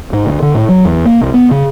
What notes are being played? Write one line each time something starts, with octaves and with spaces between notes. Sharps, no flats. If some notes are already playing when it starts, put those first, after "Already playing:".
G#2
D2
D3
A2
F#3
E2
A#3
C2
B3
C#3